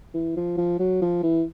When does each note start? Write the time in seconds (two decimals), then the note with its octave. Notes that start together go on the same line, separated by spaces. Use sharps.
0.14 E3
0.36 F3
0.58 F3
0.79 F#3
1.02 F3
1.23 E3